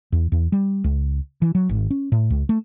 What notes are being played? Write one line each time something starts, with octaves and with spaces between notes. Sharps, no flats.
E2
E2
G3
C#2
E3
F#3
G#1
C#4
A2
C#2
A3